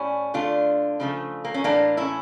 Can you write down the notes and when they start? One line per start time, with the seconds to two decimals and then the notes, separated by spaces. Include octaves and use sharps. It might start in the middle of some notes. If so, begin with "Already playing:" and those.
Already playing: A2 G3 C#4 E4
0.34 D3 A3 D4 F4
1.00 C#3 F3 A3
1.45 A#3
1.54 C#4
1.64 A2 E3 A3 A#3 D4
1.97 C#4 E4